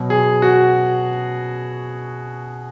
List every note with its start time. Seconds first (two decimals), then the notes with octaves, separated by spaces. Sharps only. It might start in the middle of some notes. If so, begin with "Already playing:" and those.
Already playing: B2 F#3
0.10 G#4
0.42 F#4